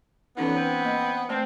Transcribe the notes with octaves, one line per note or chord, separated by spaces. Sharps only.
D3 E3 F#3 B3 C#4 D#4
C4 B4
A#3 D#5
A3 C4 D5 A5